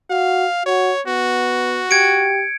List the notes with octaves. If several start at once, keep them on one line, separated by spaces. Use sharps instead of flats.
F#4 F5
F#4 C#5
B3 F#4
G4 G#6 C#7 D7